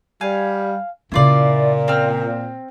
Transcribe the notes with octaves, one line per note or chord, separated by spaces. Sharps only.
G3 F5 G#5
A#2 C#3 C#4 E4 F4 D5
C4 F6